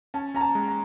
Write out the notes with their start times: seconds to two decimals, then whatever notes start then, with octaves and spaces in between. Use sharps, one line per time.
0.14 C#4 A5
0.34 C#4 A#5
0.41 A5
0.55 G#3
0.68 A#5